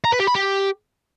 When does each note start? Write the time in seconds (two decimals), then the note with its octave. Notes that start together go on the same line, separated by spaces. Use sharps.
0.05 A#5
0.12 B4
0.20 G4
0.27 B5
0.35 G4